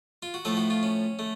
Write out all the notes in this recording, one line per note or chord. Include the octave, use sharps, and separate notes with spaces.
F4
F#4
A2 F3 A3 A4
F#4
F4
C#4
A3